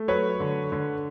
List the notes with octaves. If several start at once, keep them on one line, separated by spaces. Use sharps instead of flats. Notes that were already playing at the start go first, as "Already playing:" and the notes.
Already playing: A3
F#3 B4 C#5
D3
D3